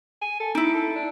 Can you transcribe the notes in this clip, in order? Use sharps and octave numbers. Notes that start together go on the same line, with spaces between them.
G#5
A4
D#4 E4 D6
A4
D4